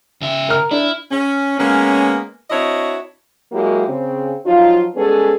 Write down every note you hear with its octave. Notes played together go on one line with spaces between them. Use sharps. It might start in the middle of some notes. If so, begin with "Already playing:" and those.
C#3 E5
A#4 F6
D4 E4
C#4
G#3 A#3 B3 C#4
C4 D4 E4 F#4 C#5 D#5
F#3 G#3 A#3 E4 F#4 G4
C#3 C4
F3 F#3 D#4 F4
G3 G#3 B3 C#4 G#4 A4